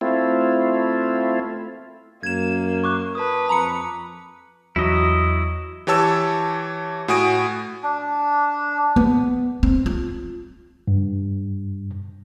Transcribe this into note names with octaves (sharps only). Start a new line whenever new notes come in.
A3 C4 E4 F4
F#2 A#3 G#6 E7
C#6 D6 F#6
B4 A5 D#6
F2 A#5 B5 C#7
E2 F#3 E4 D#5
E3 G4 C#5 A5 E6
A2 F#4 G#5 D#6 D7
D4
B3
C4
F4
G2